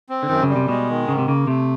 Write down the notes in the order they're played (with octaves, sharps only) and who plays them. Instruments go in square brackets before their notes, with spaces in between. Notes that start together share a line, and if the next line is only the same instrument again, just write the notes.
[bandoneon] C4
[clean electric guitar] D3
[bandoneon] F#2 [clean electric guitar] D#3
[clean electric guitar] C#3
[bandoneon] G3
[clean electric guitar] C3
[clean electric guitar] B2 [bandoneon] G#3
[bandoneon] D#3
[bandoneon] G#2 [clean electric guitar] C#3
[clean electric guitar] C3
[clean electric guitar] C#3 [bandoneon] A#3
[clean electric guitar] C3 [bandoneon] A3